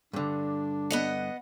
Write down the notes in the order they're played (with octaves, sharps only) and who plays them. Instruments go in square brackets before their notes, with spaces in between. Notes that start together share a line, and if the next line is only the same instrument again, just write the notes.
[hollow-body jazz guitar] G2 D3 [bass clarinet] D4
[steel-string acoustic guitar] B3 D#5 F#5